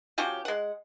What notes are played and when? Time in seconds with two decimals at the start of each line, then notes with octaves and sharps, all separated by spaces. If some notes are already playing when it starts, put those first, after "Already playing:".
0.18 F3 C#4 F#4 G4
0.45 G#3 F#5